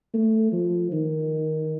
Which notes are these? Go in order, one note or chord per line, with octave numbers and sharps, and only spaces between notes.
A3
F3
D#3